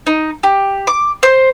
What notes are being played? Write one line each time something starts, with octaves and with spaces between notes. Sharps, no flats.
D#4
G4
D6
C5